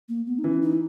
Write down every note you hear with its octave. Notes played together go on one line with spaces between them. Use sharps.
A#3
B3
D#4
E3 C#4
D#4